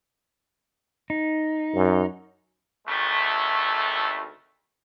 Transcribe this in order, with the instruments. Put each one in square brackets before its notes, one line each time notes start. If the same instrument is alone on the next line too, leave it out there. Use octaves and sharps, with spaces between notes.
[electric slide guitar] D#4
[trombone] F#2
[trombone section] G#1 D2 A3